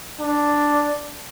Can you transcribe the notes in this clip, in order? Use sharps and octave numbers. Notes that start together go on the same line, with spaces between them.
D4